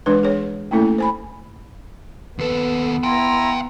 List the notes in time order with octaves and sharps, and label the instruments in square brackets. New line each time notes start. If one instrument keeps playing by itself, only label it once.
[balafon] E3 G#3 D4 B4
G#4 C#5
A3 A#3 C#4 E4 A4
C5 G#5 B5
[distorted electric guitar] D#2 A4 [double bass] B3 [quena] B4
[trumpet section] E4 A#5 [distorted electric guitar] F5 G5 [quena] C6